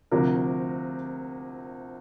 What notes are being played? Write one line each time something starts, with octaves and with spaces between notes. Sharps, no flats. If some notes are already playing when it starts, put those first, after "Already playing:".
D2 C3 F3 A#4